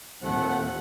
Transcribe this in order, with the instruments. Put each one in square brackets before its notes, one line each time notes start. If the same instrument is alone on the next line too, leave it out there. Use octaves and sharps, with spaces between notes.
[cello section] D#2 A#2 [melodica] A3 [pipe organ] C4 [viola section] F4 F#5